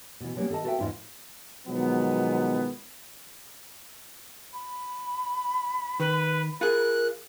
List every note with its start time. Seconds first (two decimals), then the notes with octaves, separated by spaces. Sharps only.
0.20 B2 E3
0.36 D3 F#3 G3 A#3 B3 C#4
0.50 D#3 A4 C5 D#5 A5
0.64 F#4 A4 B4 D5 E5 G5
0.79 E2 G#2 D#4 F4 B4 E5
1.67 B2 D#3 F3 F#3 G#3 B3
4.53 B5
6.00 D#3 B4
6.61 F4 G#4 A#4 F#6